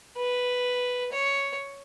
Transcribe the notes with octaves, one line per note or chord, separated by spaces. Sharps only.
B4
C#5